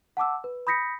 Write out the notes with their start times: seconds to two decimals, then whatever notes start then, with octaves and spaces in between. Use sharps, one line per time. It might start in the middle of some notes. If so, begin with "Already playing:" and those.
0.17 F#5 A5 D6 E6
0.44 B4
0.67 B5 D#6 G6 A#6 B6 C#7